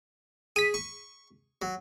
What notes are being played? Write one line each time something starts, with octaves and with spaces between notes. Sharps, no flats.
G#4 B6 D#7
C#6
F#3